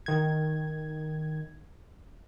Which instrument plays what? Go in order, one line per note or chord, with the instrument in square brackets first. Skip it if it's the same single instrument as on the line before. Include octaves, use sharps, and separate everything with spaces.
[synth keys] D#3 G#6